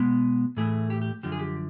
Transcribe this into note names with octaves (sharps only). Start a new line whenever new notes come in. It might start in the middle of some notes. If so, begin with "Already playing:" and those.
Already playing: B2 G#3 B3
A2 E3 A3 G#4
G4
G4
F#2 D3 F3 G4
G#4
G4